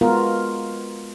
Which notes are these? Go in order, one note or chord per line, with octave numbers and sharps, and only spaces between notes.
G#3 B3 F4 F#4 A#4